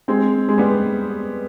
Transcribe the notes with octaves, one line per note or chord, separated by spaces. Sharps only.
G#3 C4
G#3
G3 B3